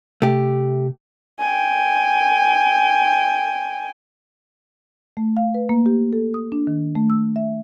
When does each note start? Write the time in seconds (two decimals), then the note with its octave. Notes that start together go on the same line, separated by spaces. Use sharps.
0.22 C3 A3 G4
1.40 G5 G#5
5.17 A3
5.37 F5
5.54 B4
5.69 A#3
5.86 G4
6.13 A4
6.34 D#6
6.52 D4
6.67 D#3
6.95 A3
7.10 E6
7.36 E5